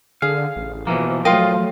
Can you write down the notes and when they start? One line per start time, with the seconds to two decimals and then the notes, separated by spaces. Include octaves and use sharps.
0.22 D3 G#4 F5
0.56 A1
0.87 B2 E3 F3 A#3
1.25 F#3 A3 F4 A#4 D#5 F5 G5